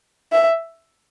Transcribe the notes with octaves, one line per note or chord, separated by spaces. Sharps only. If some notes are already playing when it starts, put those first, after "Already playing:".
E5